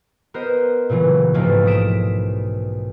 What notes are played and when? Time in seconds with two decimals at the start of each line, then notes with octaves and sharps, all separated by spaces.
0.34 B3 A#4 C5 D#5
0.89 A#2 C#3 E3 F#3
1.34 B1 G#2 E3 F3 A3 A#3
1.66 D#6 B6 D7 E7